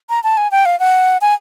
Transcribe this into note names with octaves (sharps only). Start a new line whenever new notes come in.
A#5
A5
G#5
G5
F5
F#5
G#5